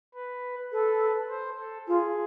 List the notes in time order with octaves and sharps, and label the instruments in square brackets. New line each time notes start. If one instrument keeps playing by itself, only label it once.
[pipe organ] B4
[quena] A4 [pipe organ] B4
[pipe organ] C5
A4
[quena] F4 [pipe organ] G#4